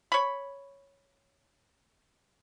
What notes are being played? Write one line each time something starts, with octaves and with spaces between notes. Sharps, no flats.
C#5 B5